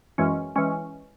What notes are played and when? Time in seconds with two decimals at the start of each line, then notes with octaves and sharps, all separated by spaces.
0.18 F#2 E3 G#3 C#4
0.56 E3 G#3 C#4